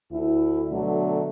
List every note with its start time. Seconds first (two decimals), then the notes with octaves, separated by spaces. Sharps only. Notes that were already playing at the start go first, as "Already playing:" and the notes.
0.11 D2 E4
0.70 B2 D3 F#3 A3